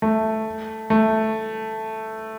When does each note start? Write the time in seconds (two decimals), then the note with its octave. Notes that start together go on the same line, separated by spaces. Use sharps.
0.02 A3
0.90 A3